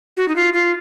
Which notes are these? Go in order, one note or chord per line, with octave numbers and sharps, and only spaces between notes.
F#4
D#4
F4
F4